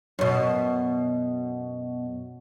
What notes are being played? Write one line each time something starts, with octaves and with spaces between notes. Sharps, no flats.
F#2 B2